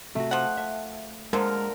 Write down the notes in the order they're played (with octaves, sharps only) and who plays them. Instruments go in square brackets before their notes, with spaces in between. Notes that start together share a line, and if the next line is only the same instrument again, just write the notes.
[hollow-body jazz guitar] C3 F#4 [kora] A3
[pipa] F3 F#5
[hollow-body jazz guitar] E5
[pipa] D3 F3 [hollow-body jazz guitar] G#3 [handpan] A#4